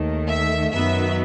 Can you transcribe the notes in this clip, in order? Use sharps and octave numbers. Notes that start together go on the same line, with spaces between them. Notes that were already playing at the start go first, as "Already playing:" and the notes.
Already playing: D#2 D#3 A3
E5
F#2 D#3 F#3 B3 E5